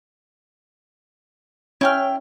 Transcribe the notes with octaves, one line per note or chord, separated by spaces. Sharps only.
C#4 E4 G5 F6